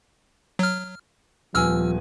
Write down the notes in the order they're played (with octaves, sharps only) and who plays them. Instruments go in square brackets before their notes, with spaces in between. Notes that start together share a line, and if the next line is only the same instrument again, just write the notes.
[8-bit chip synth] F#3 F6
[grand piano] D#1 B3 G#5 [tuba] F3 [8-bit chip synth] E6 F6